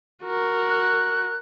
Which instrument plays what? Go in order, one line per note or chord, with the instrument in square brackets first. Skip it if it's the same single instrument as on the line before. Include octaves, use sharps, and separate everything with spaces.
[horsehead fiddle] F#4 A#4
[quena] F#6